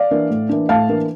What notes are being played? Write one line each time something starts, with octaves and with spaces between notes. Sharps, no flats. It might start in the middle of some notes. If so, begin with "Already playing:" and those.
Already playing: D5 F5
E3 A#3 D4
A2
E3 A#3 D4
A2 F5 A5
E3 A#3 D4